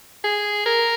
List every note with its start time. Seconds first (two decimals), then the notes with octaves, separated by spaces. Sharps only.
0.24 G#4
0.66 A#4